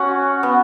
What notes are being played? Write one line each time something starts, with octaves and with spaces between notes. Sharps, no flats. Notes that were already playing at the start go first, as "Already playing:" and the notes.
Already playing: C#4 F#4
B3